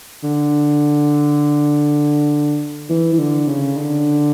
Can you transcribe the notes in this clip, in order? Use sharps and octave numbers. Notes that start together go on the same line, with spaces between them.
D3
E3
E3
D3
C#3
D3